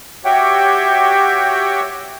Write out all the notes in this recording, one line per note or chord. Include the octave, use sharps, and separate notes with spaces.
F#4 G4 C#5 E5 F#5 G5